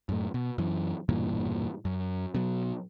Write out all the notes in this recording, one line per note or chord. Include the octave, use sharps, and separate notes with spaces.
F#2 A2
B2
F#2 E3
E1 G2 A#2 E3
F#2
B2 F#3